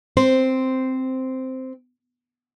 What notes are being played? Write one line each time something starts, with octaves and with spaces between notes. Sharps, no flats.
C4 C5